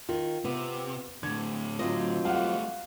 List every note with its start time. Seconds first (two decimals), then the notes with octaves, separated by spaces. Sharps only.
0.09 D#3 F4
0.45 C3 B3
1.23 A2 D3 G#6
1.79 F#3 C4 F4 D#5
2.25 G3 A3 F5 F#5